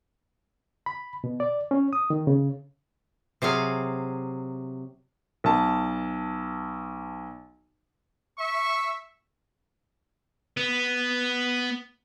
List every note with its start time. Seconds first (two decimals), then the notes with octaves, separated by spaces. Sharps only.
0.86 B5
1.24 B2
1.40 D5
1.71 C#4
1.93 D#6
2.10 D#3
2.27 C#3
3.42 C3 F#3 G#4 F5
5.44 B1 A5
8.39 E5 C#6
10.57 B3